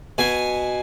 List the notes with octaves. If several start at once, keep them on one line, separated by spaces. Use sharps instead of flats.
B2 G#5